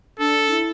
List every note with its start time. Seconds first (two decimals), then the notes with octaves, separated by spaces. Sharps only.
0.19 D4 A4
0.50 E4